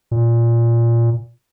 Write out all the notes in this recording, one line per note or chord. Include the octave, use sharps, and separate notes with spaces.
A#2